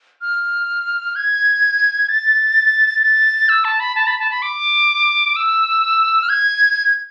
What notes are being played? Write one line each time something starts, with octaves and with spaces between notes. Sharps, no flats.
F6
G#6
A6
A6
E6
A5
B5
A5
B5
A5
B5
D6
E6
F6
G#6